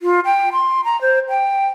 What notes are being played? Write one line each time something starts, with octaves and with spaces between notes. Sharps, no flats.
F4
G5
C6
A#5
C5
G5